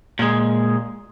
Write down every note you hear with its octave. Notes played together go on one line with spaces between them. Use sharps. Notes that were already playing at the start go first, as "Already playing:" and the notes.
A#2 G#3